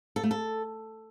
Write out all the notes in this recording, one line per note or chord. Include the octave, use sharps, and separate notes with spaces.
A4
A3
A4